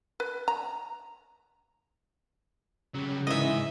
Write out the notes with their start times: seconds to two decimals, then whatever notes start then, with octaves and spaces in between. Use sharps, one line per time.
0.20 B4
0.48 A#5
2.95 C#3 F#3 G3
3.27 G#2 E3 D#5 E5